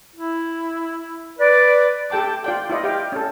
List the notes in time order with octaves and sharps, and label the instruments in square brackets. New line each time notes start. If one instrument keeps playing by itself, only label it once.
[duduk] E4
[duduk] B4 [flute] D5
[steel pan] G4 A4 G5 A5 D6
F4 D5 G5
E4 F4 D5 D#5
G4 F5 G5
C#4 A4